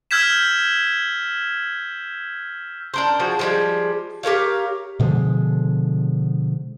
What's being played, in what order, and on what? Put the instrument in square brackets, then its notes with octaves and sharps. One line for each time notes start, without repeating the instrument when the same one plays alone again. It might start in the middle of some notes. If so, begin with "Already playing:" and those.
[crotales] E6 F6 G6 G#6 B6 E7
[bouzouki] D4 A#4 C5
F3 F#4 G#4
F3 G3 G#3
G4 A#4 C#5 F5
[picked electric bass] B2 D3 F3 G#3